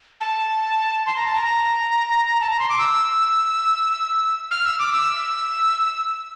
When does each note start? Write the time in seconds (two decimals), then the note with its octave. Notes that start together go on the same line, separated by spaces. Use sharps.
0.21 A5
1.06 C6
1.17 A#5
1.26 A5
1.36 A#5
2.41 A5
2.50 A#5
2.59 C6
2.69 D6
2.78 E6
4.51 F6
4.65 E6
4.79 D6
4.93 E6